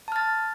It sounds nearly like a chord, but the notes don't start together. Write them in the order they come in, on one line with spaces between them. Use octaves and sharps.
A5 F6 A6